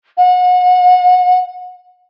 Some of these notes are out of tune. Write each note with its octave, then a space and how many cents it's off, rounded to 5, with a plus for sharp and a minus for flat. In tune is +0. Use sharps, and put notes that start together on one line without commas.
F#5 -35